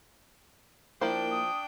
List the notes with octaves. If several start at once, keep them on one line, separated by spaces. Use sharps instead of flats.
F3 A#3 D4 E4 A#4 C5 G5
D#6